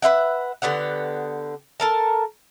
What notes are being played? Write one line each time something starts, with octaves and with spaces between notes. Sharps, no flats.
B4 C5 E5 F#5
D3 B3 G4 F#5
A4 A#4 A5